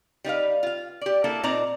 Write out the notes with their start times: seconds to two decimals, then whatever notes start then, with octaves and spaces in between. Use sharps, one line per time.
0.24 G3 D#4 B4 F5
0.63 F4 F5
1.01 G4 D5
1.24 A#3 D4 E4 A4
1.43 A#2 C4 D#4 D5 A#5